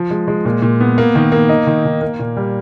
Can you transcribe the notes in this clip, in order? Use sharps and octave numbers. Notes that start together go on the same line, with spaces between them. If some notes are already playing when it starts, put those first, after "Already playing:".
Already playing: F3
G#3
G#3
A#2
A#2
B3
A#3
D#3
A#3
D#4
D#3
D#3
A#3
A#2
G3